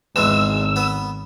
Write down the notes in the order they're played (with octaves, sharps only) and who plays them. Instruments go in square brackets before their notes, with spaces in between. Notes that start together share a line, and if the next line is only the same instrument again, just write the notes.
[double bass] G#1 [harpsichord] E2 G#3 [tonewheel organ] E6
[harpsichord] B3